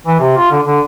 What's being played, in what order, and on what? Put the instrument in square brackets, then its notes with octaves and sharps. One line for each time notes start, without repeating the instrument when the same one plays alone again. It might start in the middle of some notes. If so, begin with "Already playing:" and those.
[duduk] E3
C3
F4
D3
D3